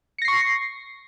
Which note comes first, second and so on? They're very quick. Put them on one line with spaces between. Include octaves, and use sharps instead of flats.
C#7 A#6 C7 C#6